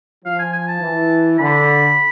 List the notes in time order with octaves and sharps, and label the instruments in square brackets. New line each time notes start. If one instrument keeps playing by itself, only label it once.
[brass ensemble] F3 [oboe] F5
[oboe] G#5
G#5
A5
[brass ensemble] E3
[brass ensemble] D3 [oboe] B5